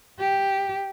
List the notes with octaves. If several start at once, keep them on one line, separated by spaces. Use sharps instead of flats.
G4